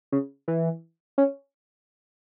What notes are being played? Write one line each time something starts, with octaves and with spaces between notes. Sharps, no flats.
C#3
E3
C#4